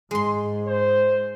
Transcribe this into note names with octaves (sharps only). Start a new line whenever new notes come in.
G#2 G#3 C6
C5